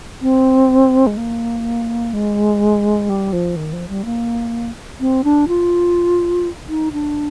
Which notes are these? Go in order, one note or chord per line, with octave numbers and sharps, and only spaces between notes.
C4
G#3
A#3
G#3
G3
F3
D#3
F3
G3
A#3
C4
D4
F4
D#4
D4